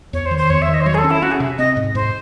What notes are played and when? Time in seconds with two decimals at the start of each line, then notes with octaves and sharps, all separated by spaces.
0.13 E2 C#5
0.26 C5
0.31 D#3
0.38 C5
0.50 E2 C#5
0.62 E5
0.68 D#3
0.74 D#5
0.81 C5
0.86 F#3 C#5
0.94 G#4
0.98 A4
1.04 C#4
1.10 E4
1.22 C#4 F#4
1.31 G#4
1.40 C3 E5
1.58 C4 D#5
1.77 G#2
1.95 G#2 C5